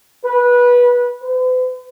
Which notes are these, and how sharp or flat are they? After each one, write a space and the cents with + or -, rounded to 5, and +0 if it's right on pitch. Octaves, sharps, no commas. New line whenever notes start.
B4 -20
B4 +45